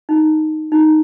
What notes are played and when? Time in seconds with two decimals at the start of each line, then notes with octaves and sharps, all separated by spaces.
0.09 D#4
0.72 D#4